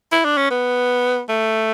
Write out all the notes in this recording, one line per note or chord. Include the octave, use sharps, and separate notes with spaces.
E4
D4
C#4
B3
A3